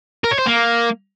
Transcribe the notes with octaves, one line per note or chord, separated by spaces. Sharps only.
A#4
C#5
C5
A#3